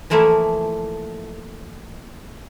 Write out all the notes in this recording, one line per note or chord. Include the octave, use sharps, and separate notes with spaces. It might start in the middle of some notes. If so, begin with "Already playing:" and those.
E3 F3 A3 A#3 E4